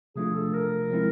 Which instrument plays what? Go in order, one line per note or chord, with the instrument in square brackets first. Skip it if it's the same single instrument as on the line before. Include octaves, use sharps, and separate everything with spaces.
[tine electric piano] C3 F3 A3 D4 F4 [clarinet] G#4
[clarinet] A4
A#4
[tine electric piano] F3 G#3 C4 E4